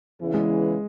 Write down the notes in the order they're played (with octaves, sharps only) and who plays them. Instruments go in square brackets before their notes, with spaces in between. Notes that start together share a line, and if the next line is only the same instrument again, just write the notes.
[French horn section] E2 C#3 E3
[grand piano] G#3